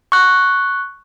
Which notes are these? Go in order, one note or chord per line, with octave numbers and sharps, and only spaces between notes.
C#6 F#6